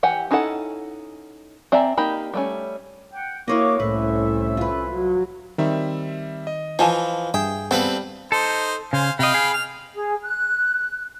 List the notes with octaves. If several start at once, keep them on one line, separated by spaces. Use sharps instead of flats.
E3 G4 F#5 G#5
C#4 D#4 E4 A4 F#5
C4 D5 E5 G#5 A#5
A#3 D#4 G4 B5
G3 A3 C#4
F#5 G5
A#3 E4 F#4 C#5 D#5 F5 D6
C2 A2 C#4 A4 B4 C5 E5
F4 B4
F#3
D#3 G3 C4 E5
D#5
E3 F3 F4 G#5 A5
G2 G#4 E5 G5
G3 B3 C4 A4 B4 F5
D#4 A4 C5
C#3 C5 F5 G#5
C3 D#5 F5 G5 B5
G#4
F6
G#4
F#6